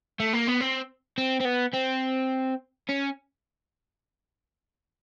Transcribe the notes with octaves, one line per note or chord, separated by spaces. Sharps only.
A3
A#3
B3
C4
C4
C4
B3
C4
C#4